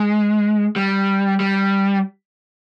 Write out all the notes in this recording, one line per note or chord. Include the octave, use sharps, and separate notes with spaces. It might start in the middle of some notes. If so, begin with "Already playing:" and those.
Already playing: G#3
G3
G3